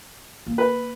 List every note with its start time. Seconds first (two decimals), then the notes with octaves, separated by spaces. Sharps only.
0.47 A#3
0.58 B4